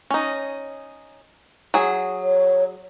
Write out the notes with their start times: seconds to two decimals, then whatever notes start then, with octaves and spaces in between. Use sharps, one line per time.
0.10 C#4 D#4
1.74 F#3 G#4
2.24 C#5